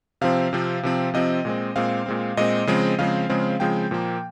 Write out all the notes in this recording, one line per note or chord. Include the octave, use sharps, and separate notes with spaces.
C3 F3 C4 F5
C3 F3 C4
C3 F3 C4
C3 F3 C4 D#5
A#2 G#3 C4
A#2 G#3 C4 F5
A#2 G#3 C4
A#2 G#3 C4 D#5
C#3 F3 G#3 C4
C#3 F3 G#3 C4 F5
C#3 F3 G#3 C4
C#3 F3 G#3 C4 G5
A#2 F3 A#3